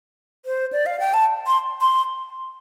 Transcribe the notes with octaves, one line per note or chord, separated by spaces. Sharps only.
C5
D5
F5
G5
A5
C6
C6